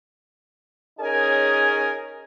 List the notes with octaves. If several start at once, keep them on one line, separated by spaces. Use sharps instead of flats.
C#4 D#4 G#4 A#4 G#5